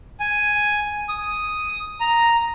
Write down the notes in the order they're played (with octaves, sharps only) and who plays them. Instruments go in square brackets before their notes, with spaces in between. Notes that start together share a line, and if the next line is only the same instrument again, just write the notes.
[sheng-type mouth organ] G#5
D#6
A#5